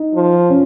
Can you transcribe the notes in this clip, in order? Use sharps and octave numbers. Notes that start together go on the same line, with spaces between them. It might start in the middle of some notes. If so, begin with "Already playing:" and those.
Already playing: D#4
F3
C#4